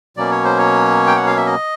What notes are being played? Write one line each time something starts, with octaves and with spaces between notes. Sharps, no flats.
B2 F#3 A#3 C#4 D5
C#5
C5
C#5
G5
F#5
F5
E5
D#5